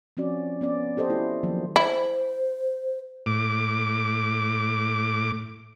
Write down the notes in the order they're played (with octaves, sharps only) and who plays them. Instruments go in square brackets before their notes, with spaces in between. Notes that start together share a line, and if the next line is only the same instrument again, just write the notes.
[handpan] F3 C4 C#4 F#4 D5
B3 C#4 D5
G4 A4 C5 D#5
A3 E4 F#4
D#3 F3 F#3 A#3
[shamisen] E4 [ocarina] C5
[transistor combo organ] A2 D6